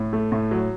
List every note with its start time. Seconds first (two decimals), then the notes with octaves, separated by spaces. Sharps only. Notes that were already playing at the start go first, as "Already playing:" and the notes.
Already playing: A2
0.13 A3
0.32 A2
0.51 F#3